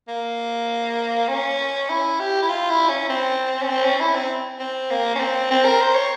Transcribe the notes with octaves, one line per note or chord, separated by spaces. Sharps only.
A#3
C#4
E4
G4
E4
F4
E4
C#4
C4
C#4
C4
C#4
E4
C4
C4
A#3
C#4
C4
C4
A#4
C5
C#5